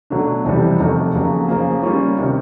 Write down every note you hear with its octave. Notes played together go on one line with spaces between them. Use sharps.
B2 F#3 A3 D4
F2 C3 E3 G3
F2 C3 D#3 F#3 A3
F2 C#3 F#3 A#3
C#3 F3 A#3
G3 A#3 C#4 F4
C3 D#3